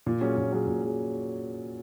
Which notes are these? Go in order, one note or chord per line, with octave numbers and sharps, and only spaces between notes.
A#2
F#3 C#4 G#4
A#2
F#3 C#4 G#4
A#2
F#3 C#4 G#4